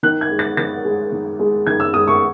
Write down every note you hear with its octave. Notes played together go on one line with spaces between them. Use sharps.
D#3 F#6
G#6
G#3
A6
D#3 A6
G#3
D#3
G#3
D#3 G#6
E6
G#3 D#6
C#6